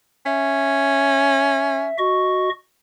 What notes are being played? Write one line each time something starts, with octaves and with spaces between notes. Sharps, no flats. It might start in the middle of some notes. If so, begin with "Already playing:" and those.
C#4 E5
F#4 D#5 C#6